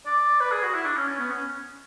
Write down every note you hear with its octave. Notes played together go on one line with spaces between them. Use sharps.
D5
B4
G#4
F#4
E4
D4
C#4
C#4
B3
C#4